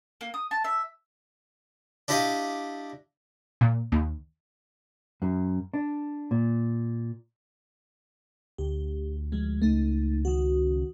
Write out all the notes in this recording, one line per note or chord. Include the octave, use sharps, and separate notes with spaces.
A#3
D#6
A5
E5
D4 E4 G4 D#5 F5
A#2
D#2
F#2
D4
A#2
D2 G4
F3 G#3
C#2 A3 D#4
D#3 F#4